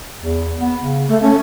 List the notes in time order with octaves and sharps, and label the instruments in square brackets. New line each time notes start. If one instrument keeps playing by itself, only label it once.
[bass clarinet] E2
B3
C#3
[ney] A3
[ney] C#4 [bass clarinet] A4